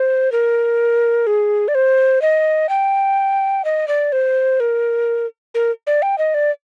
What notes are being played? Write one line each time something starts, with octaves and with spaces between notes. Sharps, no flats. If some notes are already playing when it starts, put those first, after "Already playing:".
Already playing: C5
A#4
G#4
D5
C5
D#5
G5
D#5
D5
C5
A#4
A#4
D5
G5
D#5
D5